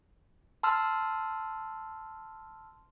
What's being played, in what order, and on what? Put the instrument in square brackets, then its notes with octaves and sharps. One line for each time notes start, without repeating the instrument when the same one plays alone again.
[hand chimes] A5 C6 E6 F6